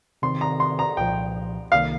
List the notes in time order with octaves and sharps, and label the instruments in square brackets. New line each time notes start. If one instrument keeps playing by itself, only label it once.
[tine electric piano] C3 D#3 C4 [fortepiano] C6
[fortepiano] A#5
C6
A#5
[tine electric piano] C2 A#2 F3 [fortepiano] G5
[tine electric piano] C2 C3 D#3 A#3 [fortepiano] F5